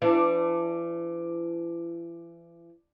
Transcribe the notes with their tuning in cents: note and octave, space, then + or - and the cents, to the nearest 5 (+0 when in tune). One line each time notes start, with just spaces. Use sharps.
E3 +40 D4 +0